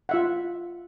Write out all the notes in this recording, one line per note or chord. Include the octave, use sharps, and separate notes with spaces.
F4 E5 F#5